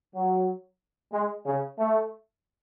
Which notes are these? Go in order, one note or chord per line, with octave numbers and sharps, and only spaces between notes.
F#3
G#3
C#3
A3